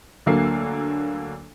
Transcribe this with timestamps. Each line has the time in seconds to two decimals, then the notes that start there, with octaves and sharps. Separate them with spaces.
0.26 D2 D3 F#3 A#3 A4 C7